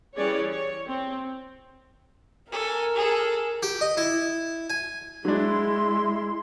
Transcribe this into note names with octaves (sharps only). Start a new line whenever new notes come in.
E3 G3 C#4 G#4 C#5 D5
C#5
C4
A4 A#4 G#5
G#4 A4
G4
D#5
E4
G#5
F#3 G#3 D4 E4 C6